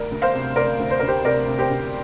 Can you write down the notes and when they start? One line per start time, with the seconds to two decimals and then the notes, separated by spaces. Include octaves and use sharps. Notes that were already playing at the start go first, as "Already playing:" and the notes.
Already playing: D2 A#4 D5
0.11 D2
0.22 C5 F5
0.34 C3
0.56 C3 A#4 D5
0.79 D2
0.90 C5
0.99 D2 A#4
1.08 G4 C5
1.24 C3 A#4 D5
1.48 C3
1.59 G4 C5
1.71 D2